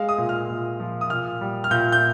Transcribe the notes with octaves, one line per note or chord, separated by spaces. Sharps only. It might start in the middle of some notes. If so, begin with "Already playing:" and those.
Already playing: G#3 F5
D#6
A#2
F6
A#2
F3
D#6
A#2 F6
G3
F6
A#2 G6
G6